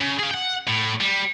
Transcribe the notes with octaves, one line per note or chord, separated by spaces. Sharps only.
C#3
G#4 F5
F#5 G5
A2
G3